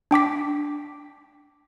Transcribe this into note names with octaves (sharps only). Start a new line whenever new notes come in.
D4 G5 D6 B6